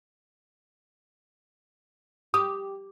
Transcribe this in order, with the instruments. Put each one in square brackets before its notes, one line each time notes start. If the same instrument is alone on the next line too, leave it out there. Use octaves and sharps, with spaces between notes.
[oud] G4 [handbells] D#6